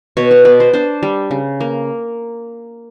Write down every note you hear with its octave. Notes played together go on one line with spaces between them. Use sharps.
B2 C#5
C#5
B3 D5
C5
D4 C5
G3
C#3
A#3